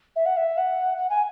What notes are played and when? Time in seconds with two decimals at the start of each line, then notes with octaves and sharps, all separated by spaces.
0.16 E5
0.26 F#5
0.37 E5
0.58 F#5
0.98 F#5
1.10 G#5